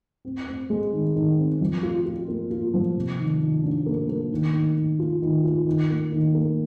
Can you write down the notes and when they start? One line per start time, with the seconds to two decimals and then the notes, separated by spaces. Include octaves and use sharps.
0.25 C4
0.47 C4
0.70 G#3
0.93 D#3
1.16 D#3
1.38 C4
1.61 F3
1.83 F4
2.06 F4
2.28 A#3
2.51 F4
2.74 F3
2.96 C3
3.19 D#3
3.41 D#3
3.64 D4
3.86 A#3
4.09 A#3
4.31 D#3
4.54 D#3
4.76 D#3
4.99 F4
5.22 D#3
5.44 F4
5.67 D#3
5.90 A#3
6.12 D#3
6.34 A#3